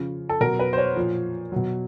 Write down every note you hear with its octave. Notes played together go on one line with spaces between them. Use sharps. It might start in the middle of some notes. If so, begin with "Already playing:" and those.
Already playing: C#3 F3
A4
B2 F#3 A#4
B4
C5
C#5
A#2 F3
B2 F#3